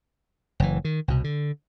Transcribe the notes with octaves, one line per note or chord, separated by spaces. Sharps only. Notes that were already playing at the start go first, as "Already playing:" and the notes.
F#1 E3
D#3
C2 B2
D3